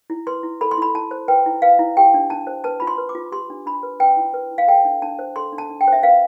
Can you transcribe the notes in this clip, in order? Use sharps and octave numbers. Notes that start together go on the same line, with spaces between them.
E4
B4 C6
E4
A4 B5
C6
E4 B5
E4 A5
C5
B4 G5
E4
B4 F5
E4
G4 G5
D4
D4 A5
C5
B4 A5
F4 B5
C6
B4
D6
F4
G4 C6
D4
D4 B5
B4
B4 G5
E4
B4
E4
F5
A4 G5
D4
D4 A5
C5
A4 C6
D4
A5
D4
G5
C5
E5
B4 F5